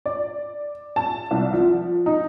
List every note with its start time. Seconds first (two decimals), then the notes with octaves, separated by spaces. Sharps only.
0.06 D5
0.96 A5
1.31 C2
1.53 F3
2.06 D#4